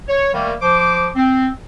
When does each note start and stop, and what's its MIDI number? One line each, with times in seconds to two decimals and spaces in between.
0.09 0.29 73
0.34 0.53 51
0.34 0.53 55
0.34 0.53 57
0.34 0.53 58
0.62 1.08 53
0.62 1.08 72
0.62 1.08 86
1.16 1.47 60